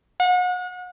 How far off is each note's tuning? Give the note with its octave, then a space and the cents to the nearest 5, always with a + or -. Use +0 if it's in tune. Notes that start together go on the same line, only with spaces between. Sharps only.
F#5 -35